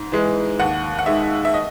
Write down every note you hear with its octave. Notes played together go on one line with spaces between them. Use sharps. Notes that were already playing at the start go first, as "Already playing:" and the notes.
Already playing: G#2
E3 G#3
D#2 F#5
F#5
D#3 G#3 E5
E5
D#5